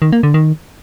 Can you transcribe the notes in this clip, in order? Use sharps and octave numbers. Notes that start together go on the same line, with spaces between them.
D#3
A#3
D3
D#3